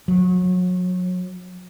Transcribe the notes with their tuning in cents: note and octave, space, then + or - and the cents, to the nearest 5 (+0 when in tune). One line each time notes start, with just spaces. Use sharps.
F#3 -30